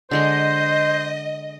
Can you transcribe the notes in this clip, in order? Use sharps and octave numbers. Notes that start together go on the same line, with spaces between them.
D3 G#3 C5 D#5 C6